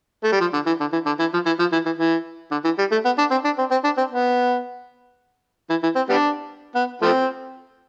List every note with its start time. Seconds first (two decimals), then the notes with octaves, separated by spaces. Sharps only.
0.24 A3
0.32 G3
0.40 F3
0.53 D3
0.66 E3
0.80 D3
0.93 E3
1.06 D3
1.20 E3
1.34 F3
1.46 E3
1.59 F3
1.72 E3
1.85 E3
1.98 E3
2.51 D3
2.65 E3
2.79 G3
2.92 A3
3.05 B3
3.18 D4
3.31 C4
3.45 D4
3.58 C4
3.71 C4
3.84 D4
3.98 C4
4.11 B3
5.70 E3
5.83 E3
5.96 C4
6.09 G3 B3 D4
6.75 B3
7.02 F3 A3 C4